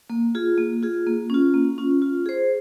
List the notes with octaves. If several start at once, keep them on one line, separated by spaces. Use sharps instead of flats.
A#3
F4 G#4
A#3
F4 G#4
A#3
C#4 F4
A#3
C#4 F4
F4
G#4 C5